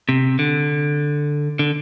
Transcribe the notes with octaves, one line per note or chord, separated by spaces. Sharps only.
C3
D3
D3